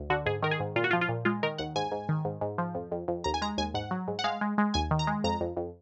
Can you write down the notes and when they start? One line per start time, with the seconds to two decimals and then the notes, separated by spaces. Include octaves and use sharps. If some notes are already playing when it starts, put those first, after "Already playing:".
Already playing: D2
0.10 D3 F#4
0.26 G#2 G#4
0.42 D#3 A#4
0.51 G#4
0.60 G#2
0.76 A#2 F4
0.84 F#4
0.91 F3 F4
1.01 F4
1.09 A#2
1.25 G#3 F4
1.43 D#3 A#4
1.58 D#2 F#5
1.76 G#2 G#5
1.92 G#2
2.09 D#3
2.25 G#2
2.41 G#2
2.58 F3
2.75 F2
2.92 F2
3.08 F2
3.24 D#2 A#5
3.34 G#5
3.42 G#3 A#5
3.58 D#2 G#5
3.74 G#2 F#5
3.91 F#3
4.08 G#2
4.19 F#5
4.24 G#3 F5
4.41 G#3
4.58 G#3
4.74 D#2 G#5
4.91 D#3
4.99 A#5
5.07 G#3
5.24 F2 A#5
5.41 F2
5.57 F2